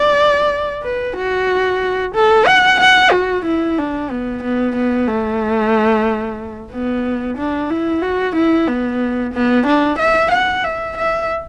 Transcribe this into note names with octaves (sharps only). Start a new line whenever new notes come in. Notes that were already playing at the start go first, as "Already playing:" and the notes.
Already playing: D5
B4
F#4
A4
F#5
F#5
F#4
E4
D4
B3
B3
B3
A3
B3
D4
E4
F#4
E4
B3
B3
D4
E5
F#5
E5
E5